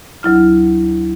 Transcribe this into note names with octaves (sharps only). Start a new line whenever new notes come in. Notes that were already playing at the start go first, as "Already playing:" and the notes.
D2 F#3 E4 F6